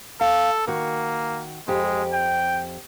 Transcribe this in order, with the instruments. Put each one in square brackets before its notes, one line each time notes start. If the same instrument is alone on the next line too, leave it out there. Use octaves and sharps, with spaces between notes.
[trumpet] A4 [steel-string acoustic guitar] F5
[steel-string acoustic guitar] D#3 F#4 [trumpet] A#3
[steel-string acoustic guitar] F2 G4 [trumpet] G#3
[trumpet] G5